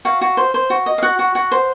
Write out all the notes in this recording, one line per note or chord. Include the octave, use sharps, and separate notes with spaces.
F#4 F5
F#4
C5
C5
F#4
D#5
F5
F#4 F#5
F#4
F#4
C5